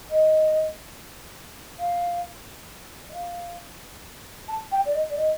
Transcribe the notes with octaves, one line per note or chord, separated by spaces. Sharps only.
D#5
F5
D#5
F5
A5
G5
D5
D#5
D5
D#5